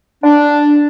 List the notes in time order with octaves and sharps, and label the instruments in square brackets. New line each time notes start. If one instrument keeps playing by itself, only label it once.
[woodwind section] D4